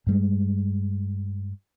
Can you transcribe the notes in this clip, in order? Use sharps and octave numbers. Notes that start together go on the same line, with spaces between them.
G2 G3 G#3